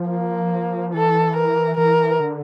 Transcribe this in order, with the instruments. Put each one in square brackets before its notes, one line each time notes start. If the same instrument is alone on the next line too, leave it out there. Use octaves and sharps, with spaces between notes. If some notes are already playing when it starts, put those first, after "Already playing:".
Already playing: [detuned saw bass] F3
[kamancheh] A#3
[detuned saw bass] E3 [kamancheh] A4
[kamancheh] A#4
[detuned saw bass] E3 [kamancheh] A#4
[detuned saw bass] D3